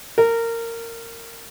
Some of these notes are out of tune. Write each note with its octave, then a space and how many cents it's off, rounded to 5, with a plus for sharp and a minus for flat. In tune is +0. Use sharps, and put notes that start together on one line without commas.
A#4 -20